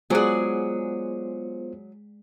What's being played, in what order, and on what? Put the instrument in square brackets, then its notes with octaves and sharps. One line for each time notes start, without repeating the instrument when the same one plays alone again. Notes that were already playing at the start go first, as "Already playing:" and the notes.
[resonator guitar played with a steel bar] F#3 G#4 [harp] G#3 D5 F#5 [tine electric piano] B3 F4 C5